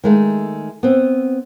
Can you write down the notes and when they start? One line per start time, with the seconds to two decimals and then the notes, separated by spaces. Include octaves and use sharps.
0.04 D#3 G#3 A3
0.83 B3 C4